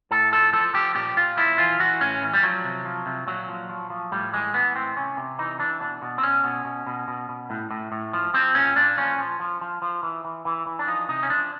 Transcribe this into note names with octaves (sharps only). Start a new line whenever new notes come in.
A2 A4
F3 A4
F3 A4
F3 G4
A#2 G4
A#2 F4
F3 E4
E3 F4
E3 F#4
A2 C#4
E3
G3
F3 F#3
C3
F3
C3
A#2 F#3
F3
F3
F3
A2 G3
E3 G#3
E3 B3
A2 C4
C3 C#4
C3
E3 D#4
E3 D4
B2 D4
B2
C4
B2 C#4
B2
B2
B2
B2
B2
A2
A2
A2
F3
F3 C4
A#2 C#4
A#2 D4
F3 C#4
F3
F3
F3
F3
E3
E3
E3
E3
D4
F3 D#4
C3 D#4
C#4
F3 D4